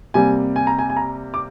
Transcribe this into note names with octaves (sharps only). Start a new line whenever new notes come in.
C3 G3 A#3 G#5
G#5
A#5
G#5
G#5
A#5
D6